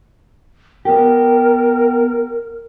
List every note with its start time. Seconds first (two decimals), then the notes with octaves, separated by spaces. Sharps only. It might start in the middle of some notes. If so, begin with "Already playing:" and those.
0.85 B3 G4 A#4